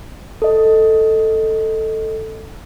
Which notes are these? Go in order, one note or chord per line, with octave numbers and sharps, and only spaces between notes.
A4 D#5